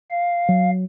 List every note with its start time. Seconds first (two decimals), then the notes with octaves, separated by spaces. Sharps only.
0.11 F5
0.49 F#3